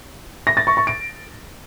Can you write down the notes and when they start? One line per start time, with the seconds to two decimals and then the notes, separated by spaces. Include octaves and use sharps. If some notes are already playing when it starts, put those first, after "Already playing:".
0.47 A#6
0.57 A6
0.67 C#6
0.77 C#6
0.87 D7